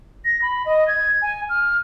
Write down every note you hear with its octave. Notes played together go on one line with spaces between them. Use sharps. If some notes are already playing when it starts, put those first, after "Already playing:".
A#6
B5
D#5
G#6
G#5
F6